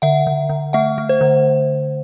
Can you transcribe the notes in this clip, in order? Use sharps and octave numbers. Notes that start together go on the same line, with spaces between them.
D3 E5 F#5
D3
D3
A3 E5 F#5
A3
C5
D3